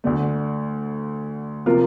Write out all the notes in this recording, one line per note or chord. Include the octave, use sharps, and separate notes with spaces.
D2 D3 A3
C3 F3 A#3 F4 A#4